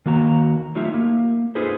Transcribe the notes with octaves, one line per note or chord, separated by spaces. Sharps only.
D#3 A#3 F#4 A#5
F#3 A3 D#4 F4 G4 E5
A#3
D#4 F4 G#4 A4 B4 C5